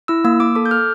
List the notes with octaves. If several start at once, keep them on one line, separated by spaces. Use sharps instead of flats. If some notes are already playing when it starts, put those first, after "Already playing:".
E4 E6
A#3 E6
A#3 D6
A4 D6
G6
A4 F6